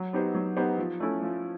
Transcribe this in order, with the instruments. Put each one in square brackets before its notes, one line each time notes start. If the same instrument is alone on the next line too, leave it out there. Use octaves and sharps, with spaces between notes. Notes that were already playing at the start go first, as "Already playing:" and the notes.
Already playing: [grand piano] F#3
B3 D#4 G4 C5
F#3
B3 D#4 G4 C5
F3
A3 C#4 E4
F3